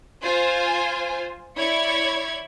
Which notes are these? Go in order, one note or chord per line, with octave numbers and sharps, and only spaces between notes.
F4 C5 G#5
E4 C#5 D5 B5 G#6 C#7